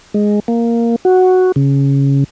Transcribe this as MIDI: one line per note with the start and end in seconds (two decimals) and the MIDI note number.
0.14 0.40 56
0.48 0.96 58
1.05 1.52 66
1.56 2.24 49